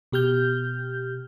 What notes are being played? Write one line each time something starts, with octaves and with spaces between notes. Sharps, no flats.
B2 G4 F6 G6